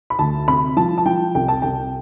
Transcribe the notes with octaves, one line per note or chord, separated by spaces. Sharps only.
B5
D2 A5
C3 B5
F3 A5
A5
F3 G5
C2 G5
A5
C2 G5